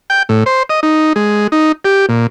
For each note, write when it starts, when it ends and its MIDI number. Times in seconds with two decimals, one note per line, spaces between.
0.10 0.23 79
0.29 0.44 45
0.46 0.63 72
0.70 0.80 75
0.83 1.13 63
1.16 1.47 56
1.52 1.72 63
1.85 2.06 67
2.09 2.27 46